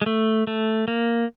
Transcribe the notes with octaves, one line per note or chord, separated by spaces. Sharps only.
G#3
A3
A3
A#3